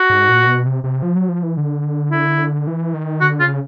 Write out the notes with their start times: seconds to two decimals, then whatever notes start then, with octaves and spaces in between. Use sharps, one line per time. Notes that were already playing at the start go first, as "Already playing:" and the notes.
Already playing: F#4
0.10 G#2
0.29 A#2
0.47 B2
0.66 C3
0.84 C3
1.02 F3
1.15 F#3
1.29 F3
1.43 E3
1.57 D3
2.11 E4
2.67 E3
2.94 D#3
3.21 D3 F#4
3.40 C#3 F4